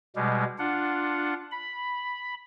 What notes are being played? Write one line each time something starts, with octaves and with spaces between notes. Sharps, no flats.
B2 G3 G#3
D4 F4 F#5
B5